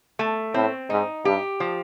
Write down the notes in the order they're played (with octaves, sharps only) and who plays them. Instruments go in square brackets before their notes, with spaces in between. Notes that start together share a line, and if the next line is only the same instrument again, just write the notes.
[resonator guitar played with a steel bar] A3
[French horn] A2 [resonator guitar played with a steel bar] C4
[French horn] G#2 [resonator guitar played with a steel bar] D#4
[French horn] G2 [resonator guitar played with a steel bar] G4
[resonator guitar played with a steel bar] F3